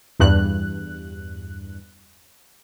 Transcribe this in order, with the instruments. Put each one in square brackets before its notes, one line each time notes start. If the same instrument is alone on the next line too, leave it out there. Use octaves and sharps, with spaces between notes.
[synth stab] E2 G2 F#6